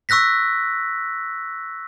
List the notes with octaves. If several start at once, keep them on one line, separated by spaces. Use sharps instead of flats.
C#6 E6 F#6 A#6 B6